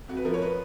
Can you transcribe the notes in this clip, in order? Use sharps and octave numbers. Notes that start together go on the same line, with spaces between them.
F2 F#4
B4
F3 A#4
C#5
B4